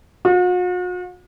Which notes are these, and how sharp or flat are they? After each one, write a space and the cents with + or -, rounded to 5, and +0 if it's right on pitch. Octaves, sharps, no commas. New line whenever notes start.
F#4 -45